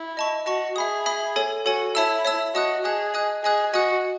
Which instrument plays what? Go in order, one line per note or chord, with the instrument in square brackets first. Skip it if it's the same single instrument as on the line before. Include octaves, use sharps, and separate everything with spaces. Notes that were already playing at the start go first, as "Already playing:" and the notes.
Already playing: [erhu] E4
[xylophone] D#5 A5 C#6
[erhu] F#4 [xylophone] D#5 A5 C#6
[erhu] G#4 [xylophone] E5 B5 D#6
[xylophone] E5 B5 D#6
A4 C#5 G#5
[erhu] F#4 [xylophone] A4 C#5 G#5
[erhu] E4 [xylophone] C#5 E5 A5 E6
[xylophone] C#5 E5 A5 E6
[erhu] F#4 [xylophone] D#5 A5 D#6 F#6
[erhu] G#4 [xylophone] D#5 A5 D#6 F#6
[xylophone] D#5 G#5 D#6 F#6
[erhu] G#4 [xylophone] D#5 G#5 D#6 F#6
[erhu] F#4 [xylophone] D#5 G#5 D#6 F#6